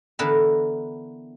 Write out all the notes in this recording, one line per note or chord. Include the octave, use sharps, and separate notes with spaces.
D3 E3 B3 A#4 E5 A5